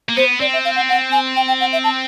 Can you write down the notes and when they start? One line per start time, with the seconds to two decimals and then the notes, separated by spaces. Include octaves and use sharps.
0.09 A#3
0.16 B3 C5
0.40 C4 D5
0.53 E5
0.65 F5
0.76 F#5
0.89 F#5
1.12 G#5
1.36 G5
1.48 G5
1.60 F#5
1.73 E5
1.84 A5